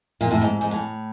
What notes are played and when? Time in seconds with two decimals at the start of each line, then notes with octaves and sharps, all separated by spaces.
0.21 A#2
0.31 A2
0.41 G#2
0.61 G#2
0.71 A2